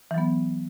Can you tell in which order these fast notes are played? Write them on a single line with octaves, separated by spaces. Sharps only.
E3 F#3 B3